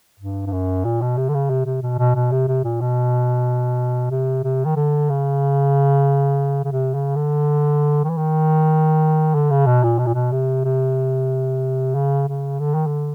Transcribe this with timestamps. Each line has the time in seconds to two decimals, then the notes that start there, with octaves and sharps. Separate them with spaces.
0.20 G2
0.46 G2
0.52 F#2
0.85 A#2
1.01 B2
1.17 C3
1.29 D3
1.34 C#3
1.50 C3
1.66 C3
1.82 B2
1.98 B2
2.15 B2
2.31 C3
2.48 C3
2.64 A#2
2.81 B2
4.11 C3
4.44 C3
4.65 D#3
4.76 D3
5.10 C#3
6.64 C#3
6.72 C3
6.94 C#3
7.16 D3
8.04 D#3
8.10 E3
8.17 D#3
9.34 D3
9.50 C#3
9.66 B2
9.83 A#2
9.98 B2
10.06 A#2
10.14 B2
10.32 C3
10.65 C3
11.95 C#3
12.28 C#3
12.60 D3
12.74 D#3
12.86 D3